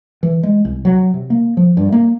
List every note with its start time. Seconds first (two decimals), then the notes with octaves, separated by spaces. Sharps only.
0.23 E3
0.43 G#3
0.65 C2
0.85 F#3
1.14 C3
1.30 A#3
1.57 F3
1.77 G2
1.92 A#3